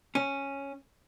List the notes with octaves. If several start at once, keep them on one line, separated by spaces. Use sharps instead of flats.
C#4